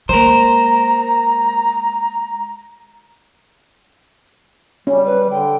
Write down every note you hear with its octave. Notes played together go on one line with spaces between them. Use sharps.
G#3 A#3 A#4 C5 A#5
G3 C#4
B4
D3 G5